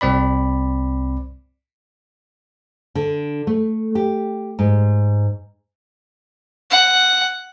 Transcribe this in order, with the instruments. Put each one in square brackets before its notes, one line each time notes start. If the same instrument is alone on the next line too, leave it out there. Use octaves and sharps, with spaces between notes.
[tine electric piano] C2 C4 D5 B5
[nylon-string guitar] D3
A3
G4
G#2
[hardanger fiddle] F#5